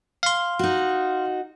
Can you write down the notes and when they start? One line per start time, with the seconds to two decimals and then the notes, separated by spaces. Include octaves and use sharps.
0.23 F5 C6
0.59 D#4 F#4